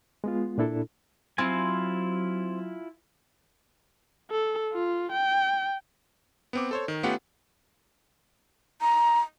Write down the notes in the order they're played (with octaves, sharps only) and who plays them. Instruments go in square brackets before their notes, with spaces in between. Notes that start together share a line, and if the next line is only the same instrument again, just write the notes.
[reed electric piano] G#3 B3 F4
A#2 D4 E4 A4
[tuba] F#3 [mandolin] C4 [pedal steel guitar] E4 F4 G#5
[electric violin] A4
F4
G5
[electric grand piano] B3 C4 D6
A4 C5 C#5
D#3
A3 B3 C#4 F4 G4 F#5
[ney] A#5